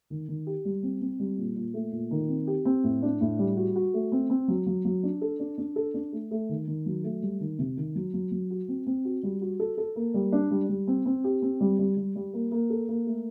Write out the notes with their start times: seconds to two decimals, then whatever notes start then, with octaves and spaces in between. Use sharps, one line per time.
0.10 D#3
0.28 D#3
0.47 G4
0.65 G3
0.83 C4
1.01 C4
1.19 G3
1.38 A#2
1.56 A#2
1.74 A3
1.92 A#2
2.11 D#3
2.29 C4
2.47 G4
2.65 C4
2.84 A2
3.02 D4
3.21 A2
3.39 G3
3.57 F#4
3.76 F#4
3.94 A3
4.12 C4
4.30 C4
4.48 F#3
4.66 F#3
4.85 F#3
5.03 D4
5.21 A4
5.40 D4
5.58 D4
5.76 A4
5.94 D4
6.12 A3
6.31 A3
6.49 D#3
6.67 D#3
6.86 F#3
7.04 A3
7.22 G3
7.40 D#3
7.59 C3
7.77 D#3
7.95 F#3
8.14 F#3
8.31 F#3
8.50 F#4
8.68 C4
8.87 C4
9.05 F#4
9.23 G3
9.41 F#4
9.60 A4
9.78 A4
9.96 A#3
10.14 G3
10.32 D4
10.51 G3
10.69 G3
10.88 C4
11.06 C4
11.24 G4
11.42 C4
11.61 G3
11.79 G3
11.97 G3
12.15 G3
12.33 A#3
12.52 A#3
12.70 A4
12.89 A#3
13.06 A3